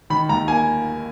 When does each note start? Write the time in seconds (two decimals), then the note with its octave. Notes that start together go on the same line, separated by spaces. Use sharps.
0.10 D#3 B5
0.29 D#2 A#5
0.48 A#3 G#5